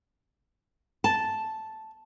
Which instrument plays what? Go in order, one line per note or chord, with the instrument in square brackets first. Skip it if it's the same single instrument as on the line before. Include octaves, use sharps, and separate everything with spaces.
[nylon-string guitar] A5